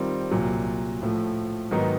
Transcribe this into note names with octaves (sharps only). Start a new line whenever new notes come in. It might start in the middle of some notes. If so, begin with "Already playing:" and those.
Already playing: D#3 G3 C4 F4
C2 A#2 F#3
A2 F3 A3
G#2 D#3 F#3 B3 D#4